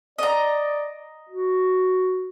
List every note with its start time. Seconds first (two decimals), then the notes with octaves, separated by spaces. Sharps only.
0.18 D5 D#5 A#5
1.29 F#4